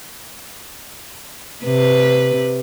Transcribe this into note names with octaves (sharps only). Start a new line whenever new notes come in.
C3 B4